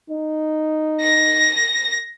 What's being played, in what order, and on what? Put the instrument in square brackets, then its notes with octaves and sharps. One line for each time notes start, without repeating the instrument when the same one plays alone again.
[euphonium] D#4
[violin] A#6